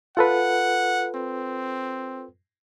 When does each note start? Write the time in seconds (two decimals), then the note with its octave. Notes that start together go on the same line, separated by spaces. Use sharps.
0.17 F4 A4 B4 F#5
1.15 C4